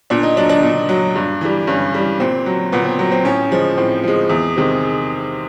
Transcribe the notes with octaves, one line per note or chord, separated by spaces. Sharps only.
A#2 D4
D#4
F#3 D4
D4
A#2
F#3
G2
E3 G3
G2 C#4
E3 G3
A#2 C4
F#3
A#2 B3
C4
F#3 C4
C4
A2 C#4
F3 G#3
A2 C4
F3 G#3
E2
C3 D#3 G#3